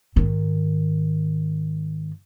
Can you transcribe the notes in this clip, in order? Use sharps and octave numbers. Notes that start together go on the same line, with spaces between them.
G#2 D#3